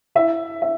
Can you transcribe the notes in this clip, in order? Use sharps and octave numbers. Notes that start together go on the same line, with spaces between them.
E4 E5
E5